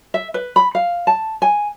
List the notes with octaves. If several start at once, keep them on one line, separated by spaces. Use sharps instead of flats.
E5
B4
B5
F5
A5
G#5